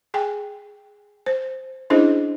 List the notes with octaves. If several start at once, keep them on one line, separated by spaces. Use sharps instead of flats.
G#4 G5 G#5
C5
C#4 D4 E4 G#4 C5 D#5